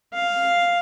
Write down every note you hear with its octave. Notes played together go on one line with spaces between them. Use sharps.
F5